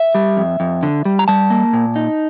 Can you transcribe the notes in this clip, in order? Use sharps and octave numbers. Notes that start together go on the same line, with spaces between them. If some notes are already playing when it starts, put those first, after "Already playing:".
Already playing: E5
G3
F2
F2
D3
G3
A#5
G3 A5
A#3
A#2
D#4